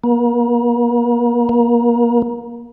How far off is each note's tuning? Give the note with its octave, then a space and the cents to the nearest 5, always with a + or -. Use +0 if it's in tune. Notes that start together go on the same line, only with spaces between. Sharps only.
A#3 +40
A#3 +30